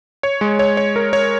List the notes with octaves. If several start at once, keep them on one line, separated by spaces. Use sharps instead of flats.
C#5
G#3
C#5
C#5
A#4
C#5